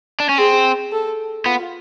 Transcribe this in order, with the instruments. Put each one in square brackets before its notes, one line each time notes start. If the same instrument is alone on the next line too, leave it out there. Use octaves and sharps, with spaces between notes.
[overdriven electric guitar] D4
C#4
[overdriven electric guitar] C4 [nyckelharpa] G#4
[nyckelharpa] A4
[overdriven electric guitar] B3 [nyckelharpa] F4